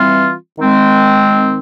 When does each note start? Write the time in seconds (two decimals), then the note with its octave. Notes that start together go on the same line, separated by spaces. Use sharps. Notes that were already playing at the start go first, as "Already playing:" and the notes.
Already playing: E3 G3 C4 F4
0.59 D#3 G#3 C4